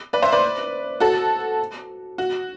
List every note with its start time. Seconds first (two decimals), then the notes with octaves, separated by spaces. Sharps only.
0.13 B4 D5
0.22 C5 E5
0.32 B4 D5
1.00 F#4 A4
2.18 F#4